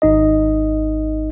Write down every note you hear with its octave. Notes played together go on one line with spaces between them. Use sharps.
G#1 D#4 D#5